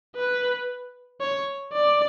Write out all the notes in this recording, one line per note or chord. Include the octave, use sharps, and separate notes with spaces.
B4
C#5
D5